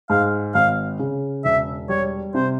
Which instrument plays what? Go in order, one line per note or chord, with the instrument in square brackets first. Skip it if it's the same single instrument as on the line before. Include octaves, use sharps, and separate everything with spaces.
[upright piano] G#2 [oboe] F5
[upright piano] G#1 [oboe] F5
[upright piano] C#3
[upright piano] E1 [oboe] E5
[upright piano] G3 [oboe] C#5
[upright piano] C3 [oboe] C5